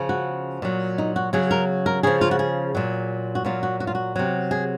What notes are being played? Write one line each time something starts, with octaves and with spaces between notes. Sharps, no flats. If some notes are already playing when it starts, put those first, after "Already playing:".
Already playing: C#3 F3
F#4
A#2 F#3
D#4
F#4
C#3 F#3 G#4
A#4
A#4
C#3 F3 G#4
F4
F#4
G#4
A#2 F#3
F#4
A#2 F#3 F4
F#4
F#4
F4
F#4
C3 F#3
G#4